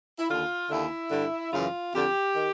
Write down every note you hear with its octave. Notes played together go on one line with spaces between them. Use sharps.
E4
D#2 D3 F4
D#2 D3 E4
G2 D3
F#2 C#3 E3 F4
F2 D3 G4
D#3